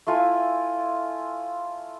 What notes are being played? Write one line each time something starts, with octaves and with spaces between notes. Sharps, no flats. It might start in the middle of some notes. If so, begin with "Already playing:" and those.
A3 E4 F4 G#5